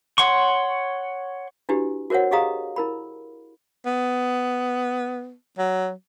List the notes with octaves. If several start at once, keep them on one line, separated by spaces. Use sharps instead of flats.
C#5 F#5 C6 C#6
D4 E4 F#4 G4 B4
F#4 A#4 C5 C#5 F#5
G4 G#4 D#5 F5 A#5 D#6
E4 A#4 B5
B3
F#3